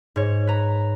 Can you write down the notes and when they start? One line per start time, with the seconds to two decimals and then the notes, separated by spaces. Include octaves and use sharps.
0.16 G#2 C#5
0.47 B4 A#5